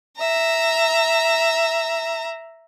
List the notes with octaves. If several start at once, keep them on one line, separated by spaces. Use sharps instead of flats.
E5 A#5